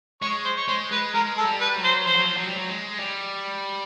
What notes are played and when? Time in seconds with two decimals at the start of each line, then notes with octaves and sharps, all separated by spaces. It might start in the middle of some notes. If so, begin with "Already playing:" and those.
0.22 G#3 C#5
0.45 C5
0.57 C#5
0.68 G#3 C5
0.91 G#3 B4
1.14 G#3 A#4
1.37 A4
1.45 G3
1.61 B4
1.76 F#3
1.84 C5
2.06 F3 C5
2.16 F#3
2.25 F3
2.37 F#3
2.47 G3
2.56 F#3
2.68 G#3
2.99 G3